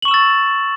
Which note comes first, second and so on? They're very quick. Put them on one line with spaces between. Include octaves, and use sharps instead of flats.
F#7 C#6 E7 E6 A6